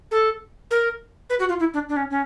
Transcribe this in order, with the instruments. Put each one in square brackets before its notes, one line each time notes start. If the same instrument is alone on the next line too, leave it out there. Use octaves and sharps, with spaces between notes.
[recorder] A4
A#4
B4
F#4
F4
E4
D4
D4
C#4
C#4